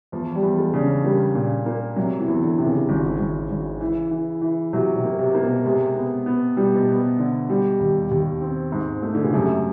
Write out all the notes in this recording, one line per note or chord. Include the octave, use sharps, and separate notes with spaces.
E2 F3
G3
E2
G#3
C#3 D4
C#4
G3 A#3
A#2
A#3
C3 F#3
E3
E2
D3
C3
C#3
G#1
G#1
G#1
E3
E3
E3
C3 F#3
C3
A#3
C3
A#3
B2
C3 G#3
B3
B3
B2 G3
B2
B3
D3
G3
D#2
D#2
C4
G#2
A3
D3
C#3
F#2 C3